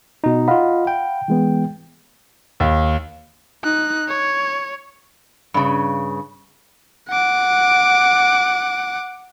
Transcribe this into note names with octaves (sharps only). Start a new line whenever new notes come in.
B2 D#4
F4 D#5 F5 F#5 B5
G5
E3 G#3 B3
D#2
D#4 F#6
C#5
G2 C#3
F#5 D6